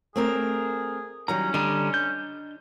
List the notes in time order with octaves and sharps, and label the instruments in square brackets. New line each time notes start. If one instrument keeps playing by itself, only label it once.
[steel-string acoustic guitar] A3 C4 A#4 [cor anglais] G#4
[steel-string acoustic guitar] D#3 F#3 G3 [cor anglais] C#4 [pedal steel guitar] A#5
[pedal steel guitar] D3 G3 A#5 [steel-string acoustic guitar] D4 D#5
[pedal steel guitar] G6